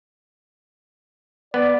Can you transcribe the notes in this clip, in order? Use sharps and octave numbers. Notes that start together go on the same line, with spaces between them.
B3 D5